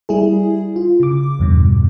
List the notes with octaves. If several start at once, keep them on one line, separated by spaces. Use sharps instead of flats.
G3 E4 G#4
F4
C#3 D6
E2 G2 B2